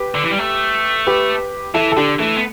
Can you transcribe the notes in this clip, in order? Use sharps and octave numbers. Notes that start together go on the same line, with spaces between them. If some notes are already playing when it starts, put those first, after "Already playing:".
Already playing: G4 B4
D3
E3
G3
A3
G4 B4
E3 E4 A4
A4
D3 D4 G4
E3 A3
B3